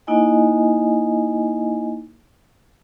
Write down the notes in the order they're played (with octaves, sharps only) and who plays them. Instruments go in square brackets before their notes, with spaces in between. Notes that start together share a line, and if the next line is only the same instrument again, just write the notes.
[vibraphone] A#3 D#4 E4 D#5 G#5